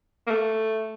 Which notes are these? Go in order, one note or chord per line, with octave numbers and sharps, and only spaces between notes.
A#3
A3